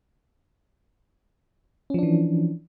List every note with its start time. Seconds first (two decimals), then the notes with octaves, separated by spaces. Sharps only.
1.90 C#4
1.94 F3
1.99 D4
2.03 E3